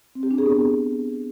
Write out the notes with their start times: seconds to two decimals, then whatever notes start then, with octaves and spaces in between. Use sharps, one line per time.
0.15 C4
0.23 G4
0.31 D4
0.38 G#4
0.46 B3